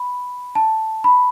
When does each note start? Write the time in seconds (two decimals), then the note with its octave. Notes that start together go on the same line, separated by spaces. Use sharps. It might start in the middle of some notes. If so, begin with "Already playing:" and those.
Already playing: B5
0.55 A5
1.04 B5